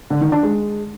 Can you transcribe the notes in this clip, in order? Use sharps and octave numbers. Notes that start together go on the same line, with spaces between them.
D3
D#3
D4
G#3